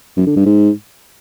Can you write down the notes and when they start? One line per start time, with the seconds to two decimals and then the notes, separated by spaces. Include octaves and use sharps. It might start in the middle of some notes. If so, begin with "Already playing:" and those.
0.17 F#2
0.27 D3
0.36 G2
0.46 G#2